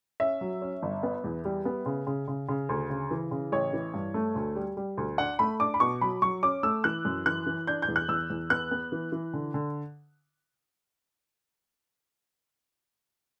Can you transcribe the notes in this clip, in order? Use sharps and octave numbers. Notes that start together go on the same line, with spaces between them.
C#4 E5
F#3
C#4
G1
B3
E2
G3
B3
C#3
C#3
C#3
C#3
D2
C#3
E3
C#3
A1 C#5
E3
G2
A3
D2
G3
G3
D2
D4 F#5
A3 B5
D4 D6
B5
B2 C#6
F#3 B5
F#3 C#6
C#4 D6
A3 E6
E3 F#6
F#2
E3 F#6
E3
D4 G6
G6
E2
F#6
E2 E6
E2
B3 F#6
B3
E3
E3
D3
D3